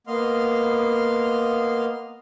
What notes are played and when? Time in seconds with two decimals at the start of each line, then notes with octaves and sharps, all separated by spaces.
0.07 A#3 B3 D#5 F5 C6 F6